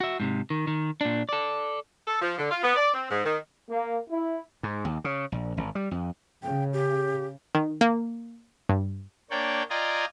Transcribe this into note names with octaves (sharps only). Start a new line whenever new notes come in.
F#4 E5
G#2 C3
D#3
D#3
A#2 D4
A4 D5
A4
F3
D3
F4
B3
D5
C4
G#2
D#3
A#3
E4
G#2
D#2
C#3
A#1
G#1
G3
F2
C#3 G5
G4
D#3
A#3
G2
A#3 D4 C#5 D5 G5
F4 D5 D#5 G5 G#5 A#5